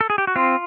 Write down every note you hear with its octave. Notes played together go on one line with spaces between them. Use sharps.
A4
G#4
G4
F#4
C4 F4